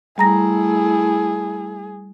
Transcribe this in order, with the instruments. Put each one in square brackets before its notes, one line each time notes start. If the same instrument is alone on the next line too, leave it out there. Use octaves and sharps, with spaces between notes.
[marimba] G3 A#5 A#6 [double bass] A3 E4 [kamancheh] G#4